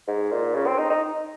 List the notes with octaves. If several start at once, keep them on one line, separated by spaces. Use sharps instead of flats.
G#2
A#2
C#3
C4
D#4
D#4